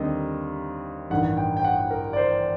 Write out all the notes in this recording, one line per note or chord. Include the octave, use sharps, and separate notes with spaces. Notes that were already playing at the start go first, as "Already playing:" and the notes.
Already playing: D#2 D3 G3 C4 D#4 D#5
A1 G2 D#3 F#5
G5
G5
F#5
A#4
D5
C5